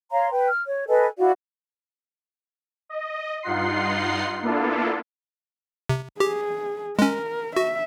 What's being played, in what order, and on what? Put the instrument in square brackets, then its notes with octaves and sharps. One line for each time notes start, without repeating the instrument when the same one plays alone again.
[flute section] C#5 F5 A#5 C6
B4 G5
F6
C#5
A4 B4 D#5 G#5
E4 F#4 D5 F5
[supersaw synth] D#5
G2 D#4 F4 F#5 C6 C7
A#3 B3 D4 E4 F4 A4
[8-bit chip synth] C3
[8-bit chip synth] G4 [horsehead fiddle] G#4
[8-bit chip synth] G#3 C#4 [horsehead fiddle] A#4
[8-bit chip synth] F#4 [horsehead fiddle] E5